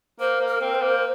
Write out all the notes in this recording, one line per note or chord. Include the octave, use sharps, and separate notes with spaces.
A#3 C5
A#3
A#4
C4
C5
A#3